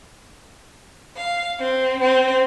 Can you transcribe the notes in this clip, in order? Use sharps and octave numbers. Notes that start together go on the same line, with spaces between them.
F5
C4
C4